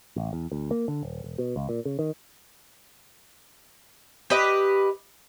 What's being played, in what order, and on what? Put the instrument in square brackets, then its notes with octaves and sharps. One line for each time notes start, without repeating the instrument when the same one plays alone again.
[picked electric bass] A1
E2
D2
A#3
D3
D#1
E1
B2
C#2
A#2
C#3
D#3
[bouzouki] G4 B4 D#5